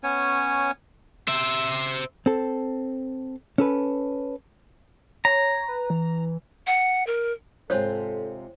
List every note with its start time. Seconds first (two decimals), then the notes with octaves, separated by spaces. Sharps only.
0.03 B3 C#4 C#5 G#5
1.28 C5 E5
2.26 C4 A4
3.58 C#4 A4 B4
5.25 C#5 A#5
5.68 B4
5.90 E3
6.67 F#5
7.07 A#4
7.70 G#2 C3 F4 A4 C5 C#5